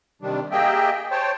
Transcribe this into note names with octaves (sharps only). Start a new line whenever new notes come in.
C3 D#3 G3 D4
A#3 G4 G#4 D#5 E5 G5
C5 C#5 G5 A5